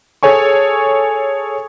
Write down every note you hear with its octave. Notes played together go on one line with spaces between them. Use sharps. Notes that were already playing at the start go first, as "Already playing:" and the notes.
G#4 A4 C#5 G#5 C#6